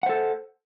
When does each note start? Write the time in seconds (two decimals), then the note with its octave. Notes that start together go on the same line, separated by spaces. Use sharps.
0.03 F#5
0.06 C5
0.09 A4